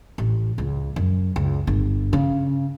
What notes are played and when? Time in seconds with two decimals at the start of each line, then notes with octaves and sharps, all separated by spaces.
0.18 A1
0.58 C#2
0.96 F#2
1.36 C#2
1.67 G1
2.13 C#3